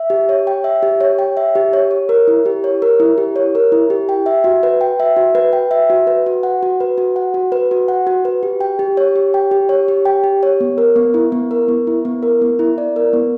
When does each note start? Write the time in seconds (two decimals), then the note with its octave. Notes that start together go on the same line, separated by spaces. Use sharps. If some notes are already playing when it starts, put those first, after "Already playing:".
Already playing: E5
0.10 G4
0.29 C#5
0.47 G5
0.64 E5
0.83 G4
1.01 C#5
1.19 G5
1.37 E5
1.55 G4
1.73 C#5
1.91 C#5
2.09 A#4
2.28 E4
2.46 G4
2.64 C#5
2.82 A#4
3.00 E4
3.18 G4
3.36 C#5
3.55 A#4
3.72 E4
3.90 G4
4.09 G5
4.26 E5
4.44 F#4
4.63 B4
4.81 G5
5.00 E5
5.17 F#4
5.35 B4
5.53 G5
5.71 E5
5.90 F#4
6.07 B4
6.26 F#4
6.43 F#5
6.63 F#4
6.80 B4
6.98 F#4
7.16 F#5
7.34 F#4
7.52 B4
7.71 F#4
7.88 F#5
8.07 F#4
8.25 B4
8.43 G4
8.60 G5
8.79 G4
8.97 C#5
9.16 G4
9.34 G5
9.51 G4
9.69 C#5
9.88 G4
10.05 G5
10.24 G4
10.43 C#5
10.60 B3
10.78 A#4
10.96 B3
11.14 E4
11.32 B3
11.51 A#4
11.68 B3
11.87 E4
12.05 B3
12.23 A#4
12.42 B3
12.59 E4
12.78 D5
12.96 A#4
13.13 B3